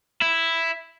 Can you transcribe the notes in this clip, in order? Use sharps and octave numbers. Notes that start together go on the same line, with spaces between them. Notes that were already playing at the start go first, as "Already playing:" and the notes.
E4